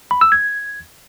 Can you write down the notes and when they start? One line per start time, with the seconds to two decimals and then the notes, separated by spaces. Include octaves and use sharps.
0.11 B5
0.21 E6
0.32 G#6